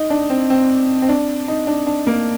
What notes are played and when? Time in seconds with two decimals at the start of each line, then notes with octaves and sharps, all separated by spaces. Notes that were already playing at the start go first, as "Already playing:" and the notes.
Already playing: D#4
0.10 D4
0.30 C4
0.50 C4
1.02 C4
1.09 D4
1.48 D#4
1.67 D4
1.87 D4
2.07 A#3